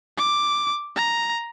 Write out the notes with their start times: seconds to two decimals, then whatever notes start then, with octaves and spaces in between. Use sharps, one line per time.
0.18 D6
0.96 A#5